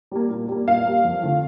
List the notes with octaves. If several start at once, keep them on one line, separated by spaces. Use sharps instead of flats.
G3 A#3
A#2
G3 A#3
A#2 F5
G3 A#3
F2
D3 A3 C4 F4